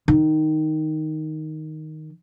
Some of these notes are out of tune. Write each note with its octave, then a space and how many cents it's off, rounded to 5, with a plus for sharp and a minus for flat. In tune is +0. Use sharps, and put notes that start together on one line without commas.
D#3 +0